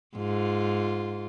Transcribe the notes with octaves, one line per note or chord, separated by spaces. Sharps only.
G#2 F4